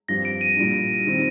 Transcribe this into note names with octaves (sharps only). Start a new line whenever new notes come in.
G2 F3 C4 G4 A#6
D7
D#7
A#2 G3 D4
D#3 G3 C4